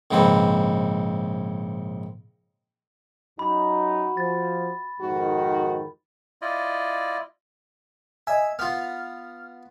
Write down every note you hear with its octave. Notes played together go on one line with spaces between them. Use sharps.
A#1 G#2 C#3 C4 B4
F#2 D#4 F#4 B5
F3 A6
F2 G#2 D#3 F#4
E4 F4 D5 D#5
D#5 E5 G#5
B3 F4 F6